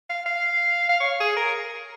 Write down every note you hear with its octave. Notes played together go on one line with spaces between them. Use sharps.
F5
F5
F5
C#5
G#4
A#4